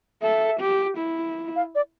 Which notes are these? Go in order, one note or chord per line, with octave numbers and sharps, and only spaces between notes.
A4 E5
G4
E4
F5
D5